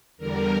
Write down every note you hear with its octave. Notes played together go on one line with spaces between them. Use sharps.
E2 D3 G3 A#4